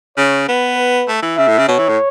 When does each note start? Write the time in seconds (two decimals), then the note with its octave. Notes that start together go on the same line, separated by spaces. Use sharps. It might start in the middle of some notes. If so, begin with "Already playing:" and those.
0.17 C#3 C#5
0.48 B3 B4
0.78 B4
1.08 A3
1.22 E3
1.37 C#3 E5
1.47 A2
1.58 C#3
1.68 B2 C#5
1.78 E3
1.89 A2